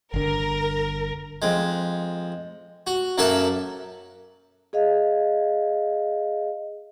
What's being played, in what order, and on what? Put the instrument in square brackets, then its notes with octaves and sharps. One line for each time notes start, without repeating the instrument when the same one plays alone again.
[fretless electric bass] G1 D3 [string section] A#4
[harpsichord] F2 G#3
F#4
F#2 F#3 A#3 A4 E5 A5
[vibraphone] G#4 D#5 F5